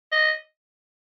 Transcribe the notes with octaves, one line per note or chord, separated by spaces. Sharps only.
D#5